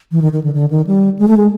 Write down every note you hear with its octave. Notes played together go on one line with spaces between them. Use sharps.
E3
D#3
D#3
D3
D3
D#3
G3
G#3
A3
G#3